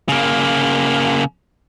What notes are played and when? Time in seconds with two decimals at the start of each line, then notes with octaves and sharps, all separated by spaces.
0.09 C#3 A#3